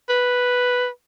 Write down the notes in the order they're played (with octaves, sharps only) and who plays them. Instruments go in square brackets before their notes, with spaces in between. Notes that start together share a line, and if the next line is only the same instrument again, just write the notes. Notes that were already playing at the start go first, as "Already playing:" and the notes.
[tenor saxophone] B4